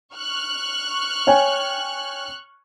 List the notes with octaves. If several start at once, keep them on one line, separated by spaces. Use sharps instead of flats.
C#6 F6 F#6
C#5 G5 G#5